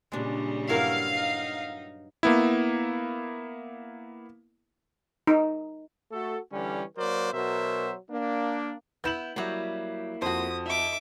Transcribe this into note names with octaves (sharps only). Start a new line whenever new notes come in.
A#2 C#3 G3 G#3 D4
G2 F#3 E4 F#4 A#4 F5
D#4
A#3 B3 E4
D#4
A3 F#4 A4
D3 E3 G3 C#4
F#3 A#3 A#4 C5 D5
B2 F#3 A#4 C5 E5
A#3 D4
B3 E4 G6 E7 F#7
F#3 G3 A#3 E4
F2 F#4 C5 D#6
D#4 E5 D6